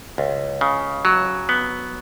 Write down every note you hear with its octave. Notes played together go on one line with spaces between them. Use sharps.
C#2
C#3
F#3
B3